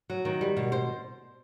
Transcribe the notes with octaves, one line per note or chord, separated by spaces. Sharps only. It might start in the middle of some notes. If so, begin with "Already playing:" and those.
F#3
D#3
G3
B2
C5